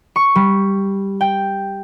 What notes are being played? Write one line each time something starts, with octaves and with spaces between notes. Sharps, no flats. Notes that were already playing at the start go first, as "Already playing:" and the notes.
C#6
G3
G5